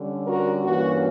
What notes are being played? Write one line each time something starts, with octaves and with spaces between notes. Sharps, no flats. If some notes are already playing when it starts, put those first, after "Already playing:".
Already playing: D3 G3 C#4
F#4 A#4
G2 E3 A#3 C#4 F#4